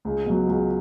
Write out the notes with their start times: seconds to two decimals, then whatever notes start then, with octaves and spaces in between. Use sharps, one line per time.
0.05 C#2
0.26 B2 F#3
0.47 C#2